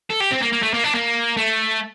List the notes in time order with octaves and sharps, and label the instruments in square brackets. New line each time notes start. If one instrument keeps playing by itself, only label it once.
[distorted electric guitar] A4
G4
C4
A#3
A#3
A3
A#3
D4
A#3
A3